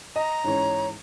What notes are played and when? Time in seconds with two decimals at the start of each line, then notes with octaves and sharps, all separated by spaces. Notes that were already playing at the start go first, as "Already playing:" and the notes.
0.16 D#5 A#5
0.44 G#2 E3 C#4 C#5